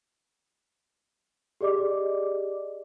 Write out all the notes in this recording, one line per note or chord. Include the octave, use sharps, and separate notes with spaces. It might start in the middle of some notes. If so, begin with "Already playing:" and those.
G4 G#4 D5 D#5 D6